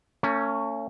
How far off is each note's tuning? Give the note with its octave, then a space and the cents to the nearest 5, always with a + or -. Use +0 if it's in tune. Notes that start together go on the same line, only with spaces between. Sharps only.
A3 +45 C#4 +5